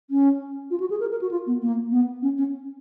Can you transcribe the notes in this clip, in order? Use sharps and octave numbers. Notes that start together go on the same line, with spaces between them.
C#4
F4
F#4
G#4
A#4
A#4
F#4
F4
B3
A#3
B3
C#4
C#4